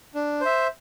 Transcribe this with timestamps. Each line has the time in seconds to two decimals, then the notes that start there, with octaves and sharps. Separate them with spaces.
0.15 D4
0.41 C5 E5